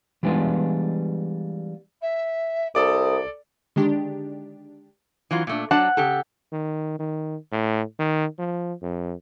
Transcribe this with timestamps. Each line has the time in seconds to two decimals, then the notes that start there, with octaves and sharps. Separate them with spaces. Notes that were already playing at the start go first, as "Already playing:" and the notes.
0.23 E3 G3 G#3 B3 D4 F4
2.01 E5
2.75 C2 A4 D5 D6 D#6
3.76 D3 D#3 G#3 D4 G4
5.31 E3 F#3 F4
5.47 A#2 A3 D4
5.71 F#3 D4 F#5 A5
5.97 C#3 G4 A4
6.52 D#3
6.99 D#3
7.52 A2
7.99 D#3
8.39 F3
8.82 F2